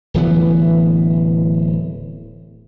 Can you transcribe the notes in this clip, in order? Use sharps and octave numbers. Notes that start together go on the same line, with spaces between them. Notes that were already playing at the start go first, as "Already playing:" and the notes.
D1 E3 B3